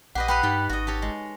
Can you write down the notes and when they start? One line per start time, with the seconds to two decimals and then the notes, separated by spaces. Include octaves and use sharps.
0.15 A#1 G4 B4 D#5 F#5
0.28 B4 G5 B5 F#6
0.43 G2 D#4 G4 G5
0.69 G#1 F#4 D#5
0.87 G4 A4 C#5
1.02 G#3